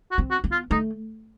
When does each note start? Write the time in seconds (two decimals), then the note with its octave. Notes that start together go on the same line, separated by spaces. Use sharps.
0.11 F#4
0.18 C4
0.31 F#4
0.44 B3
0.51 F4
0.71 A3 D#4